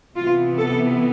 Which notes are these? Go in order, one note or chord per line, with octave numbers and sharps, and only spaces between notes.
C3 E3 B3 F4
A4